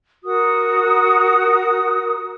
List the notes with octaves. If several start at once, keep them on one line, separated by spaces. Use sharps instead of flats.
F#4 A#4 D#6